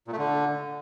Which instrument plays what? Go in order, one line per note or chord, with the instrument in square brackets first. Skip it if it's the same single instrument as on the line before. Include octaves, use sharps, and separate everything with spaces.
[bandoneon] A#2
A3
D3